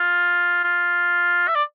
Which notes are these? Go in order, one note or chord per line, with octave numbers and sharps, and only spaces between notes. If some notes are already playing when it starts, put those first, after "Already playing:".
Already playing: F4
F4
E5
D5